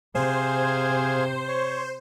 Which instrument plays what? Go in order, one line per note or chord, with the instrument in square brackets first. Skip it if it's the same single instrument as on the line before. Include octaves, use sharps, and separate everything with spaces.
[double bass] C3 [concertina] G#4 F5 G#5 [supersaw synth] C5
[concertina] C#5